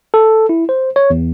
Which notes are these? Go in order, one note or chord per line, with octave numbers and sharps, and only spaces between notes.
A4
E4
C5
C#5
E2